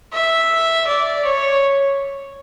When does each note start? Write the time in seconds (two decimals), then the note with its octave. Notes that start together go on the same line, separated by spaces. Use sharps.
0.13 E5
0.87 D5
1.24 C#5